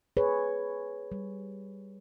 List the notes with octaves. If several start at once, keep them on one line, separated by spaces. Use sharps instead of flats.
G#4 B4 C#5
G3